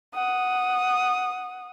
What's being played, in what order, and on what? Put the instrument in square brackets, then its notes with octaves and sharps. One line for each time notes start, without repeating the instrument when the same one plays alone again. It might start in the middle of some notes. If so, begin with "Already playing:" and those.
[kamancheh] F#5 D#6